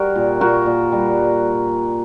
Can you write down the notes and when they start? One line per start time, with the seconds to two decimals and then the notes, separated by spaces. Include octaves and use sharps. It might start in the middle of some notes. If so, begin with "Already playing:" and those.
Already playing: G3 F#4 A#4
0.15 A#2
0.41 A#2 F#4 A#4
0.66 A#2
0.92 G3